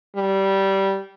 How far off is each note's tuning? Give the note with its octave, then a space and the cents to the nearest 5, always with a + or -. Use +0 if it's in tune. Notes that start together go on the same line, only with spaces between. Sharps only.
G3 -15